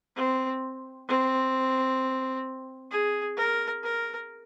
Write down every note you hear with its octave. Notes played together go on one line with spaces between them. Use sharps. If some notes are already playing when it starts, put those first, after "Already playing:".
C4
C4
G#4
A#4
A#4